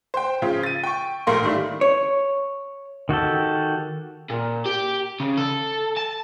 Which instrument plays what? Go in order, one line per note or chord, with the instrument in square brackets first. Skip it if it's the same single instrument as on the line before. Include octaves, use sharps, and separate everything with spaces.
[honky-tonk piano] C5 G5
C#3 F3 F4
A6 D#7
G5 C#6
A#1 A3 A#3 F5 C6
D#3 G3 A3 D4 E4
[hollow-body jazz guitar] C#5
[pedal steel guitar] D#3 F#4 G4 A4
[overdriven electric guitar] A#2
G4
C#3
A4
A5